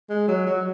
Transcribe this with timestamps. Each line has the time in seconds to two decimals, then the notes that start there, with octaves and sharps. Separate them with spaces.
0.10 G#3
0.28 F#3
0.46 F#3